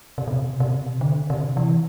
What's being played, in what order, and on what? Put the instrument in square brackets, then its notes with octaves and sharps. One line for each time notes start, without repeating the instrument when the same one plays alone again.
[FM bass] C3
B2
C3
C3
B2
C3
D3
C3
E3